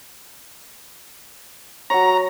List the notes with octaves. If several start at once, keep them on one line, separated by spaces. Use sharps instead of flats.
F#3 C#5 A#5